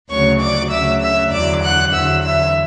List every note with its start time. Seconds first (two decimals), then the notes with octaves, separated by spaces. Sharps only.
0.09 D2 C#3 F#3 C#5 C#6
0.40 D5 D6
0.71 D2 C#3 F#3 E5 E6
1.01 E5 E6
1.32 E2 D3 F#3 D5 D6
1.63 F#5 F#6
1.93 E2 D3 F#3 E5 E6
2.23 E5 E6